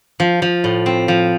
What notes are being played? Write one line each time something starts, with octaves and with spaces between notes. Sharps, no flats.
F3
F3
A2
C4
F3